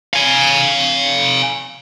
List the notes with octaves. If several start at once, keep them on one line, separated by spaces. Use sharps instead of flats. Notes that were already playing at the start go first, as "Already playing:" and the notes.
F5 G#5